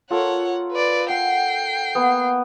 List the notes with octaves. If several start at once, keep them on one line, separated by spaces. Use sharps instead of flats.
F4 A4 A#4 C#5 F#5
B4 D5
F#5 G5 C7
A#3 B3